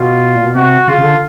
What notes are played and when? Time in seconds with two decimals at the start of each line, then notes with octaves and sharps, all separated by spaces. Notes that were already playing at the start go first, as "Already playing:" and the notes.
Already playing: B2 F4
0.35 A#2
0.45 B2
0.55 C3 F#4
0.88 C#3 F4
0.98 C#3
1.04 D3